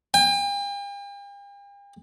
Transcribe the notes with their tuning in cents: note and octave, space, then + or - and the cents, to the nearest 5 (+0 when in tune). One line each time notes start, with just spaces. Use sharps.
G5 +45